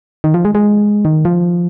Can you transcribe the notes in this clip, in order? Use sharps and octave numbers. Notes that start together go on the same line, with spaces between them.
D#3
F3
G#3
G#3
D#3
F3